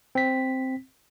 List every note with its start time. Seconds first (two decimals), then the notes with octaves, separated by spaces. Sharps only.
0.15 C4 B6